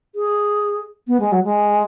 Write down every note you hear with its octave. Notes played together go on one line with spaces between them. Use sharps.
G#4
B3
G#3
F#3
G#3